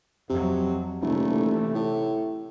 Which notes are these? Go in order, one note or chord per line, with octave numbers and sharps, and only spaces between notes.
F2 C3 F#3
D#1 C3 E3 A3
A2